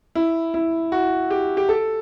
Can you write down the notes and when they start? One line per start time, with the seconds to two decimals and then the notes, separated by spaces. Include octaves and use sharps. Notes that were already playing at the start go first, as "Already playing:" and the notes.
0.15 E4
0.54 E4
0.92 F#4
1.31 G4
1.57 G4
1.69 A4